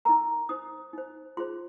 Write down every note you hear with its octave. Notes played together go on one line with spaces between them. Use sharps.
D#4 A#4 A#5
D#4 C5 D#6
D#4 C5
F4 G#4 C5 C6